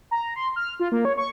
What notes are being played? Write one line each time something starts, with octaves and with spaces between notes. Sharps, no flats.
A#5
C6
F6
F4
A#3
C#5
C#6